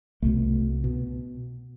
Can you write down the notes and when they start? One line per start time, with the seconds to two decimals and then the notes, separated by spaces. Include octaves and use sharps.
0.22 C2 B2 A3
0.84 B2